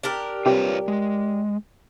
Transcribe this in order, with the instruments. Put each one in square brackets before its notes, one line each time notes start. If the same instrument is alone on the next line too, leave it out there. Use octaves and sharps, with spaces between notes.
[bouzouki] D4 G4 A#4
[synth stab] C3 G3 [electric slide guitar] F4 B4 C#5
[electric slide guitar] G#3